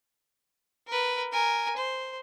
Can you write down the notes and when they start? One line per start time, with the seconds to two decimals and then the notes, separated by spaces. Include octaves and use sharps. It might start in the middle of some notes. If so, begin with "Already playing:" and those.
0.87 A#4 B4
1.32 A#4 G#5
1.76 C5